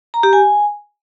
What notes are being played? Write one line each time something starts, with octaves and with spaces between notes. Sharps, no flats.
A#5
G4
G#5